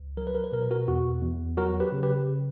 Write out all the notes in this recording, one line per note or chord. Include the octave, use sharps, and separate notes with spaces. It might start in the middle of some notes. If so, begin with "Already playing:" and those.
Already playing: C#2
F#3 A#4
B4
A#4
B4
B2 A#4
B4
F#4 A#4
E2 F#4
E2
F#3 F#4 A#4
G4 B4
C#3
G4 B4